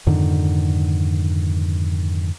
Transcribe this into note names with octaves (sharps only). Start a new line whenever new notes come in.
F2 G#2 D3 D#3